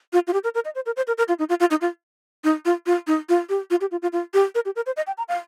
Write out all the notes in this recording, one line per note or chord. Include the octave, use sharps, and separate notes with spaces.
F4
F4
G4
A#4
A#4
D#5
C5
A#4
C5
A#4
A#4
F4
D#4
F4
F4
D#4
F4
D#4
F4
F4
D#4
F4
G4
F4
G4
F4
F4
F4
G4
A#4
G4
A#4
C5
D#5
G5
A#5
F5